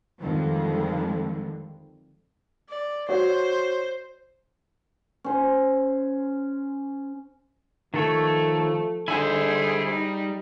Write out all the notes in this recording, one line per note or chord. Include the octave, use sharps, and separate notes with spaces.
F2 D3 D#3 F3 G3 G#3
D5
F#4 C5 C#5
C#4 C5
D#3 F3 A3 A4 C#5
D3 G3 E4 G#4 C5 G#5
D#4